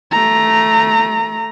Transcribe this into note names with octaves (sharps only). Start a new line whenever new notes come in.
A3 A#5